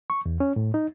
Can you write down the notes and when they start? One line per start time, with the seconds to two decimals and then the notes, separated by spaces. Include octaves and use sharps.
0.10 C#6
0.26 E2
0.40 C#4
0.56 A2
0.74 D#4